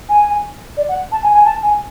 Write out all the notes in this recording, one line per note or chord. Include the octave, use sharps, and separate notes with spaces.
G#5
D5
F#5
A5
G#5
G#5
A5
G#5